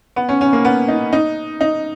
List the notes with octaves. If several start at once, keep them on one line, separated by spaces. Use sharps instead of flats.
B3
C#4
C#4
A#3
B3
D#4
D#4
D#4